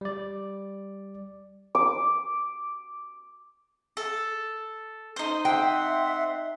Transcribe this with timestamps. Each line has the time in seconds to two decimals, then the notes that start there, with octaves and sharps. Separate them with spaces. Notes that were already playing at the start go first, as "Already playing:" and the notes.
0.01 G3 D5
1.75 D6
3.97 A4
5.16 D#4 C5
5.45 C4 E5 F#5 G5 C6